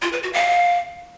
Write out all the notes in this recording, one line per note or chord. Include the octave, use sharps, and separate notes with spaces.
F4
B4
F#4
F5